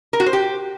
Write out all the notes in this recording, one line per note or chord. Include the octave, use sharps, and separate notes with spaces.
A#4
F#4
C5
G4